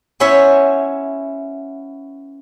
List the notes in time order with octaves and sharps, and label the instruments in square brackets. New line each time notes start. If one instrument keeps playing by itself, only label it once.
[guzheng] B3 C#4 E4 C5 C#5 E5